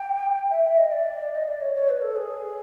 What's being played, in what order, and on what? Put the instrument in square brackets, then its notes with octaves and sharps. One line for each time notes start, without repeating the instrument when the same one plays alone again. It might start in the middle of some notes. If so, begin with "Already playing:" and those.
Already playing: [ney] G5
E5
E5
D#5
D5
D#5
D5
C#5
C#5
B4
A4
G#4